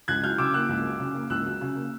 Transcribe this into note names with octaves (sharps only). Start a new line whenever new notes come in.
C#2 F#6 G#6
F#3 F6 G6
C#3 D6 E6
A#3 E6 F#6
C#2
F#3
C#3
A#3
C#2 E6 F#6
F#3
C#3
A#3